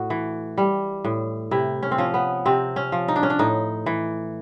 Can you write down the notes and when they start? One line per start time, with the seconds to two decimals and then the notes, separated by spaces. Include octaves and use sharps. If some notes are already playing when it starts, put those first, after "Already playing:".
Already playing: A2 F#4
0.10 E3
0.58 G3
1.04 A2
1.51 C3 E4
1.82 C#4
1.91 C4
1.98 F3 C#4
2.14 B3
2.46 C3 C4
2.76 C#4
2.92 F3
3.08 D#4
3.16 D4
3.23 C#4
3.30 D4
3.39 A2 D#4
3.86 E3